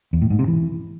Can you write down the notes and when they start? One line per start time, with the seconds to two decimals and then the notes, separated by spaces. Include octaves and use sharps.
0.13 E2
0.22 A2
0.30 G#2
0.39 C3
0.48 E3